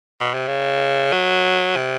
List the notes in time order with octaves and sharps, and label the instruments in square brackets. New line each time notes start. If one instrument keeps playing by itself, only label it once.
[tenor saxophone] B2
C3
C#3
F#3
C3